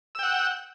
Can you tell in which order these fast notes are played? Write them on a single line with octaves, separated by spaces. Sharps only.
E6 G5 F#5